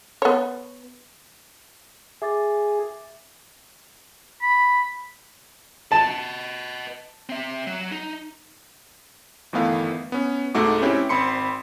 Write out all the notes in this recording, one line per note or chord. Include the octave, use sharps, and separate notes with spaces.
B3 C#5
G#4 E5 D6 A6
B5
B4 D#5 A5
C4 E5
F#3
D#4
G1 D#3 E3 A3 B3 F5
B3 C#4
C2 G#2 A3 D#4 F#4 D6
C4 C#4 E4 G4 B4 C#5
G#1 C4 B5 C6 C#7